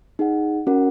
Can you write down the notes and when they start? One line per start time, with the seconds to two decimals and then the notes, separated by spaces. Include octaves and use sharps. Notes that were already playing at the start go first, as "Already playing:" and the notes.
0.19 D#4 G#4 F#5
0.67 C#4 F#4 A#4 F#5